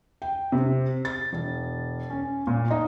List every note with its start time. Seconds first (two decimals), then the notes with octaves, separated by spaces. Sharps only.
0.22 G5
0.52 C3
1.05 A6
1.33 E1
2.10 C#4
2.47 A#2
2.71 D#4